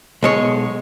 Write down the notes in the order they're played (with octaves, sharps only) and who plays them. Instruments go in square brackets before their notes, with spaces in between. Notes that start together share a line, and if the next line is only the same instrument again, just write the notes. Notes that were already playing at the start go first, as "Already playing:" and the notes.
[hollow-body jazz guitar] B1 G#3 C#5